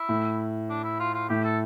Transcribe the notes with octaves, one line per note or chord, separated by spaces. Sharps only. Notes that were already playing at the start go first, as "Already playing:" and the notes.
Already playing: E4
A2
D4
E4
F4
F4
A2 G4
A4